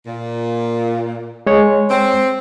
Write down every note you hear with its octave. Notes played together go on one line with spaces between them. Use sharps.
A#2
G#3 C#5
C4